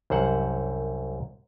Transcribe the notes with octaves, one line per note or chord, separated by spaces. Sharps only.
C2 F#2 C5 F#5